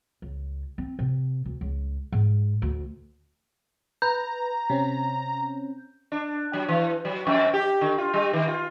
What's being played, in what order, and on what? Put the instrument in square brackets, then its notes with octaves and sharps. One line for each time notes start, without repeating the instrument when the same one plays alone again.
[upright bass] C#2
C4
C3
D2
C#2
G#2
D2
[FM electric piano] B4 [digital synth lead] A#5 [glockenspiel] G6
[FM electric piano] C3 C4 C#4
[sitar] D4
F#3
E3
F#3
F2
G4
D3
F4
G3
D#3
F4